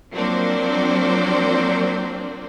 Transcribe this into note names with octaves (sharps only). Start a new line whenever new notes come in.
F3 F#3 A#3 C4 D4 C5